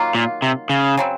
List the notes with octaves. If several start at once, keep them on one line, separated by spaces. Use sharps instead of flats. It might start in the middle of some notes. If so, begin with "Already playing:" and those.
Already playing: D#3 F#3 A#3 F4
A#2
C3
C#3
C#3 F#3 C4